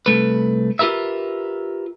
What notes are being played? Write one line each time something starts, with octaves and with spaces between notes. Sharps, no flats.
C2 A#2 A3 B4
F4 G4 A#4 B4 E5